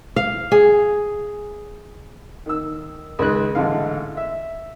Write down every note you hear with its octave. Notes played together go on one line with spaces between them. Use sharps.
F5
G#4
D#3 E6
C#2 D#3 G#3 F#6
A1 G#2 D3 F5
E5